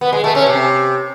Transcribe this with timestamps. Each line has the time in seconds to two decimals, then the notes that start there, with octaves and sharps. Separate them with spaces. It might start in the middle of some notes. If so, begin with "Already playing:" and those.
0.01 B3
0.13 G#3
0.24 A3
0.35 C#4
0.46 C3